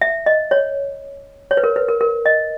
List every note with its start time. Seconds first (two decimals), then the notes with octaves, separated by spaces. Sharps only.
0.01 E5
0.26 D#5
0.51 C#5
1.51 C#5
1.57 B4
1.64 A#4
1.76 B4
1.88 A#4
2.01 A#4
2.26 D#5